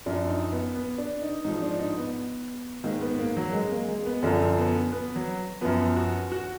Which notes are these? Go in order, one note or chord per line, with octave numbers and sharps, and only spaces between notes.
F#2 F3 D4
D#4
B3
B3
D4
D#4
G#2 F3 D#4
D4
D#4
B3
G#2 D#3 A#3
B3
A#3
F#3
G#3
A#3
G#3
B3
F#2 D3 F3 D4
B3
B3
F#3
F#2 F3 B3
F#4
F#4